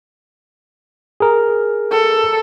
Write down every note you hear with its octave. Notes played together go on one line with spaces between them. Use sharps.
G#4 A#4
A4